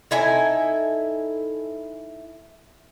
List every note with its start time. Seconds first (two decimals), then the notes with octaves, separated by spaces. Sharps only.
0.11 D#4 E4 A4 G#5